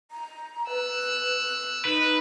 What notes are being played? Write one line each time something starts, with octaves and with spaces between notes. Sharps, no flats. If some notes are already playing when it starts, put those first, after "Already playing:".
A#5
B4 E6 F#6
D#4 B4